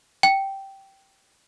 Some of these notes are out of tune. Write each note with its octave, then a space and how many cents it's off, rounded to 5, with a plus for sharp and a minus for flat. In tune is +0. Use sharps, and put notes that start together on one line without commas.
G5 -10